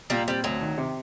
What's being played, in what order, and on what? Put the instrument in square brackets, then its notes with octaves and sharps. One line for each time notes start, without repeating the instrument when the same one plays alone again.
[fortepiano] A#2 [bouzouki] G3 A#3
[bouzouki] G3 [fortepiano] C4
[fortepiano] D2 [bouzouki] F#3
[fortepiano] D#3
C3